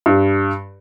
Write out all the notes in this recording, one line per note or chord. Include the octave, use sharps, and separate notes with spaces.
G2